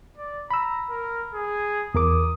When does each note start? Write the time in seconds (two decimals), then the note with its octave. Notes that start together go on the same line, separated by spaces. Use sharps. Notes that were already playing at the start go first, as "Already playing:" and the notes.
0.17 D5
0.51 A#5 B5 E6
0.90 A#4
1.33 G#4
1.94 E2 A#4 D6 D#6